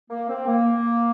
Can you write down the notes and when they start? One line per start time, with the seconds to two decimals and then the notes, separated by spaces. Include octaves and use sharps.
0.11 A#3
0.29 C4
0.47 A#3